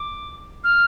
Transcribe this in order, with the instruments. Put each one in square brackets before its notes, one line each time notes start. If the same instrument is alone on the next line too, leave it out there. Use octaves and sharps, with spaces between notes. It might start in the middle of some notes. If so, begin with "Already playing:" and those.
Already playing: [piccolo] D6
F6